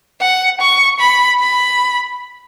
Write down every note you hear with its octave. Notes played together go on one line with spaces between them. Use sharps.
F#5
C#6
B5
B5